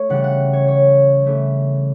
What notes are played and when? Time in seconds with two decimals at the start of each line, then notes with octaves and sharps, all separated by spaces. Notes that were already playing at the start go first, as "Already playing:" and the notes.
Already playing: A3 C#5
0.09 C#3 E3 G3 F#5
0.24 F#5
0.53 C#5
0.68 C#5
1.26 C#3 E3 A3